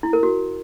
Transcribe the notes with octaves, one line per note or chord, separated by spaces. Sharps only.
E4
A#4
F#4